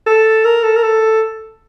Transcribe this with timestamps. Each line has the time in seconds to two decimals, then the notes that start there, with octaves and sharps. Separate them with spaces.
0.07 A4
0.45 A#4
0.63 A4
0.76 A#4
0.83 A4